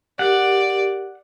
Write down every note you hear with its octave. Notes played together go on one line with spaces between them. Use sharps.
G4 A#4 D5 F#5